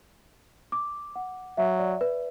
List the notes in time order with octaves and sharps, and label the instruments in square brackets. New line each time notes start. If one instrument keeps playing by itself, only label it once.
[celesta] D6
F#5
[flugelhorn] F#3 [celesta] E5
[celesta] D5
B4